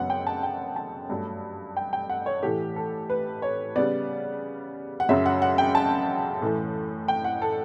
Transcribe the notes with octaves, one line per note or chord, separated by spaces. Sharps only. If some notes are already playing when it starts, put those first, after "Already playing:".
Already playing: F#2 C#3 F#3 B3 F#5
G5
A5
G5
A5
G2 F#3 A3
G5
G5
F#5
C#5
A2 E3 A3 G4
A4
B4
C#5
C#3 G3 B3 D5
F#5
F#2 C#3 F#3 E5
F#5
F#5
G5
A5
A2 E3 A3
G5
F#5
A4